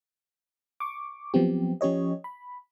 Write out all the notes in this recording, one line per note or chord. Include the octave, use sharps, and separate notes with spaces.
C#6 D6
F3 F#3 B3 C4 G4
F3 C#4 G4 C#5 D#5
B5